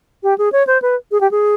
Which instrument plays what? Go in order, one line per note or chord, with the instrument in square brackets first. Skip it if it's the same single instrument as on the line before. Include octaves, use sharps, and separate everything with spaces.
[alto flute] G4
G#4
C#5
C5
B4
G#4
G4
G#4